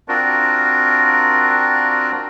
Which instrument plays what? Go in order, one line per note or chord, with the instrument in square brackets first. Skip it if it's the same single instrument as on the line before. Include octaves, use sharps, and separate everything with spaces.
[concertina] C4 D4 F4 F#4 A#4